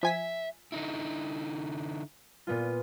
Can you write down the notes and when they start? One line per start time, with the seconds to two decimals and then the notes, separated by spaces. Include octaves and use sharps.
0.03 F3 E5 G#5 B6
0.72 D3 D#4 E4
2.47 A#2 B3 F4